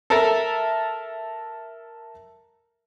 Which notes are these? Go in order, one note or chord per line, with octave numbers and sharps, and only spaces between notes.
A4 A#4 E5 A5 A#5